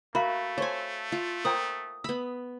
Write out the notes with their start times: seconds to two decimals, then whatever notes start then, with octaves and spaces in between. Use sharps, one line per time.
0.15 A3 F#4 A#4 E5 F5 B5
0.58 A4 C5 C#5 G#5
1.12 F4
1.45 A#4 C5 F#5 G5 D#6
2.04 B3 B5 E6